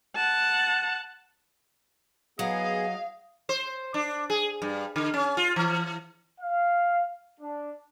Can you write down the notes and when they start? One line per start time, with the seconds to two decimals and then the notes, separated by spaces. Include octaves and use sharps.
0.16 F#5 A5
2.39 F#3 B3 G#4 D#5 F5
3.49 C5
3.94 D4
4.30 G#4
4.62 G2
4.96 D3
5.14 C#4
5.37 F4
5.56 E3
6.41 F5
7.40 D4